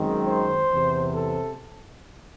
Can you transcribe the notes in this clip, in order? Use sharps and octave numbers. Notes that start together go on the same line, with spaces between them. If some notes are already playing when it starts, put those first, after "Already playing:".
Already playing: F#2 D#3 G#3 C4
C5
E2 C3 E3
A4